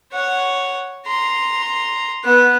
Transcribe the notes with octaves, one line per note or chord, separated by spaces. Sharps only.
C#5 F#5
A#5 C6
B3 F#6